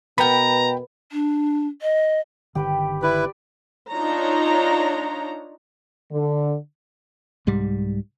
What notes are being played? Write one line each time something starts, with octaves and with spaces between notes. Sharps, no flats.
B2 B3 A#4 G5 A#5 B5
D4
D#5
G1 D3 D#3 G4 B4 G5
E4 B4 D5
D4 D#4 F4 C#5 A#5
D3
C2 G#2 G3